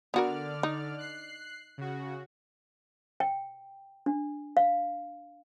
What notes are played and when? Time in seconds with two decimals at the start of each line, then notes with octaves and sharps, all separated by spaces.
0.14 D3 B3 F#4 A#4 D5 F6
0.63 D#4
0.98 F#6 C7
1.78 C#3 F#4
3.20 G5
4.06 D4
4.57 F5